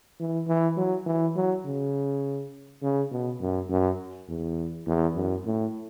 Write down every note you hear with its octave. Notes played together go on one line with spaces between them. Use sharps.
E3
E3
F#3
E3
F#3
C#3
C#3
B2
F#2
F#2
E2
E2
F#2
A2